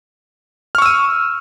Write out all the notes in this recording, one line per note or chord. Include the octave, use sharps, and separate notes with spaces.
C#6 E6 F6 D#7